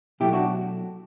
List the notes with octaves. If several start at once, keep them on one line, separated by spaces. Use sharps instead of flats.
B2 F#3 A3 E4 G4
D4 F#4